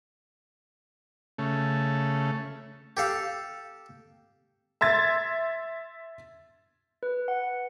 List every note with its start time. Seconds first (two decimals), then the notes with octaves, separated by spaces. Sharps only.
1.38 C#3 A3
2.97 G4 A4 F5
4.81 E5 C6 G#6 A6
7.03 B4
7.28 F#5